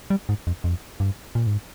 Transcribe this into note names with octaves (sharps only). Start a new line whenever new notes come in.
G3
G#2
F2
F2
G2
A#2
G#2